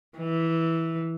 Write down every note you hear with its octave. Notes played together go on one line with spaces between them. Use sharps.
E3